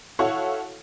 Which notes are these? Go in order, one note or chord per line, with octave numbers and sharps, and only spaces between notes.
E4 F#4 A4 C#5 F5 F#5